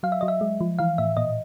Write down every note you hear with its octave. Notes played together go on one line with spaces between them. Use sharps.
F#3 F5
E5
F#3 D#5
E5
G#3
F3
E3 F5
A2 E5
A#2 D#5